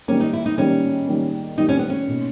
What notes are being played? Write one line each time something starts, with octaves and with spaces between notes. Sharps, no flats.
D#3 G3 A#3 C#4
D#4
E4
D#4
D#3 G3 A#3 C#4
D#3 G3 A#3
D#3 G3 A#3 D#4
C#4
B3
C#4
B2 A#3 D#4